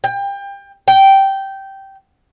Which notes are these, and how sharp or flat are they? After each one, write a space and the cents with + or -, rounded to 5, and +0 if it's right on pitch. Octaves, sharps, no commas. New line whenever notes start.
G5 +25
G5 -10